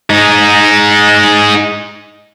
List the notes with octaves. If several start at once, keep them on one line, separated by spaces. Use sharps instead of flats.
G#3 D#4